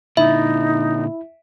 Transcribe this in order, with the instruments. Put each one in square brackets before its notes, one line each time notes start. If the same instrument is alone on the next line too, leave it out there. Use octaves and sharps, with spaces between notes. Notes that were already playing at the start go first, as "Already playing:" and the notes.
[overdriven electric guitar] A#2 D3 [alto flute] D#4 [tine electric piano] E4 [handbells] E5